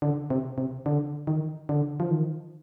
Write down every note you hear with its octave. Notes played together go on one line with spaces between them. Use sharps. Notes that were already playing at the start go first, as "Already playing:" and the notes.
D3
C3
C3
D3
D#3
D3
F3
D#3